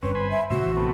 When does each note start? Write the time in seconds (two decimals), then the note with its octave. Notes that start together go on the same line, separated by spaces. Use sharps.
0.03 G1 G2 C4 C#4 B4
0.15 C5 G#5 B5
0.30 E5
0.50 A#2 C#3 A3 F#4 C5 E5
0.62 A#1 E3
0.77 C3 A3 B3